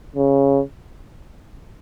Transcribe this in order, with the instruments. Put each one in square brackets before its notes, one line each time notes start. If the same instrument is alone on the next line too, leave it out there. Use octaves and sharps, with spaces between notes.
[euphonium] C#3